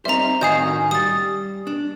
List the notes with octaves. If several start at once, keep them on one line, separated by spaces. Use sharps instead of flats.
G3 C4 D#4 C5 E5 A#5
A2 D#3 F#4 D#5 F5 G#5 D#6 G6
C#4
G3 D#6 A6
D4